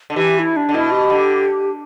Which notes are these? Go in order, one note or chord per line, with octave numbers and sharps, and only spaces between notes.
D3
E3 G4
E4
D4
D3
B2 E4
G4
D3